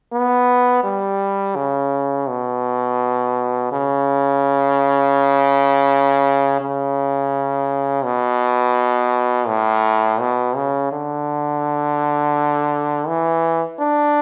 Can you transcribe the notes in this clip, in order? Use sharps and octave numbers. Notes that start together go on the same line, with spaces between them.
B3
G3
C#3
B2
C#3
C#3
B2
A2
B2
C#3
D3
E3
D4